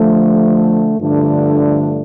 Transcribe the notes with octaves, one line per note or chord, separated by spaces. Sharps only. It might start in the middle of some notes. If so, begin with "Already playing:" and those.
Already playing: D3 F3 A3
G2 D3 F3 A3 D4